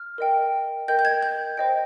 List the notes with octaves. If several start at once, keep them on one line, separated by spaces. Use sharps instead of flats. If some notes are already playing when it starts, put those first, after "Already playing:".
Already playing: F6
A#4 D#5 G5
A#4 D#5 G5 G6
G6
G#6
G6
C5 D#5 G5